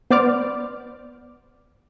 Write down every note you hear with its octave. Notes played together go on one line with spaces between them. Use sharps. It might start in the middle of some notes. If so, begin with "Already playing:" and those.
B3 C5 D5 D6 F6